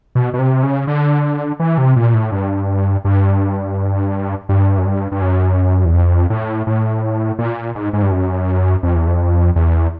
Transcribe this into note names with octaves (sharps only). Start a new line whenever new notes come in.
B2
B2
C3
C#3
D3
E3
C3
A#2
A2
G2
G2
G2
F#2
G2
G2
F#2
E2
F2
A2
A2
A#2
G#2
G#2
G2
F#2
F2
E2
F2
E2